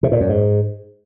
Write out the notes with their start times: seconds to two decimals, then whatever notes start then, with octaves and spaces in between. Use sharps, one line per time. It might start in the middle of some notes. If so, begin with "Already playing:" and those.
0.03 C3
0.12 A#2
0.20 F#2
0.29 G#2